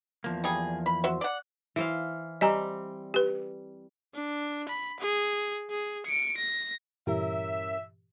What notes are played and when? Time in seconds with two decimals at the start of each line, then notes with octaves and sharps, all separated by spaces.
0.24 E2 F3 A#3
0.44 G3 G#4
0.86 B5
1.04 F#4 C5 E5
1.21 D5 F#5
1.76 E3 C5 F5
2.41 G3 C4 D#5 G#5 A#5
3.14 G4 B4
4.14 D4
4.68 B5
5.00 G#4
5.70 G#4
6.06 C#7 D7
6.37 A#6
7.07 G2 A#2 E3 C#4 E4 G4 A#4 E5